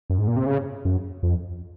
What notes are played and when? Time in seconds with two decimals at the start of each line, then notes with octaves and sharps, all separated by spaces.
0.10 F#2
0.18 G#2
0.27 A#2
0.36 C3
0.46 C#3
0.85 F#2
1.23 F2